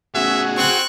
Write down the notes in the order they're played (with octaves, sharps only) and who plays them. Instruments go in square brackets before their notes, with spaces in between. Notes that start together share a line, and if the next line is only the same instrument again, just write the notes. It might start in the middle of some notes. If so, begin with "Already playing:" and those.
[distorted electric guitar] A2 C#3 [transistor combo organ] F#4 G#4 [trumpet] E5
[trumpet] C4 [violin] C#6 F#6